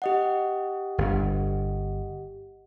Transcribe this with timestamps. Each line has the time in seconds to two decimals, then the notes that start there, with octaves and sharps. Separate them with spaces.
0.02 G4 D#5 F#5
0.98 G1 G2